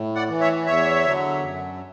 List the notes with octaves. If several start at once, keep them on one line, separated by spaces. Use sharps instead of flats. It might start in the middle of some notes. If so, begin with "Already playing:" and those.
Already playing: A2
D5 F#5
E3
C#5 E5
E2 C#5 E5
D3 F#3
F#2